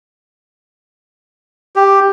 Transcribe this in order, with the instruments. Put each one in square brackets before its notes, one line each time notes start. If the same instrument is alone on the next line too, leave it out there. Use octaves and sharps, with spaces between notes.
[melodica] G4